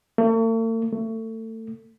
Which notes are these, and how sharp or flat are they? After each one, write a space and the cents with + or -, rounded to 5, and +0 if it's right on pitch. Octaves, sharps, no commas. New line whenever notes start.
A3 +45
A3 +25